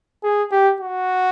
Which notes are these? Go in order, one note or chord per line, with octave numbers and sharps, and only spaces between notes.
G#4
G4
F#4